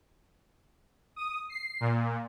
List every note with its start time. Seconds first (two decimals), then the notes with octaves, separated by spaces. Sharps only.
1.16 D#6
1.50 C7
1.80 A#2